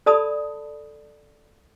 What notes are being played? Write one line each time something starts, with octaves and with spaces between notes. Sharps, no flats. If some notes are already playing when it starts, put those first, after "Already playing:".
A4 D5 A5 B5 D#6